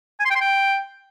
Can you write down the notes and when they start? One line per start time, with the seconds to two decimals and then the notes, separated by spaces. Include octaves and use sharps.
0.20 G#5
0.25 C6
0.31 G5
0.36 C6
0.41 G5